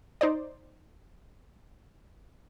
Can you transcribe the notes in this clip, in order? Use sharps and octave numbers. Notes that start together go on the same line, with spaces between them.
D#4 C5 D5